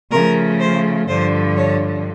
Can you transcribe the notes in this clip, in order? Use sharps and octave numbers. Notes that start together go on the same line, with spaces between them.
C#3 F3 A3 A#4
C5
G2 D3 F3 C5
C#5